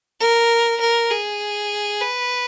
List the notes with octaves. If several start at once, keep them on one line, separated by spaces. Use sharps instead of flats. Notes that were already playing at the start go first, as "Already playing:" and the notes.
A#4
A#4
G#4
B4